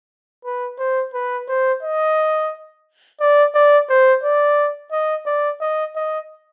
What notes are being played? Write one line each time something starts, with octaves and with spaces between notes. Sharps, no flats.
B4
C5
B4
C5
D#5
D5
D5
C5
D5
D#5
D5
D#5
D#5